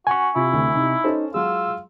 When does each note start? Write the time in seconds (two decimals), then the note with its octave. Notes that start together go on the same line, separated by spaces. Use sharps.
0.07 F#4 G#5 C#6
0.36 C3 E4 F4
0.53 D2
0.75 C3 D#4
1.04 C#4 D#4 A4 C5
1.34 F#3 G#3 F4 E6